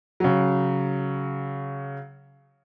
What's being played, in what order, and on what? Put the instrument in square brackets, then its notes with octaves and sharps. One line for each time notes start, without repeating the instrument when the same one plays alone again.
[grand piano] C#3 F#3